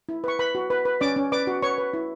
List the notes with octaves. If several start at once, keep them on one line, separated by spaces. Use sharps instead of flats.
E4
B4 C#6
B4 B5
F#4
B4
B4
C#4 D5 D6
C#4
B4 D5 D6
F#4
B4 C#5 C#6
B4
E4